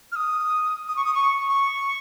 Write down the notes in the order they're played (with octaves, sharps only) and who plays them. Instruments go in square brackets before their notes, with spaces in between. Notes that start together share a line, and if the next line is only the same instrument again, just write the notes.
[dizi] F6
D#6
D#6
C#6
D#6
C#6
C#6